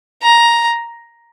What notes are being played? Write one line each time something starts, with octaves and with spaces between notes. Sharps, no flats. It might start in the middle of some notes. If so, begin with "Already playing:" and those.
A#5